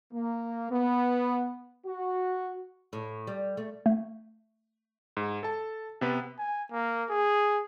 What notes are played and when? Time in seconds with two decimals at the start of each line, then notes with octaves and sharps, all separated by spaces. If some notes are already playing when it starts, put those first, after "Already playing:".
0.13 A#3
0.72 B3
1.86 F#4
2.93 A2
3.27 G3
3.57 A3
3.86 A3
5.17 G#2
5.43 A4 A5
6.01 C3 B3 B4
6.39 G#5
6.71 A#3
7.10 G#4